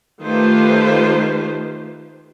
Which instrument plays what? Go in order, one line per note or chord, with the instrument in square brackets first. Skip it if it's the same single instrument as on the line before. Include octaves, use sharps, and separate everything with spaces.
[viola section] D#3 A3 F4 G4 B4 C5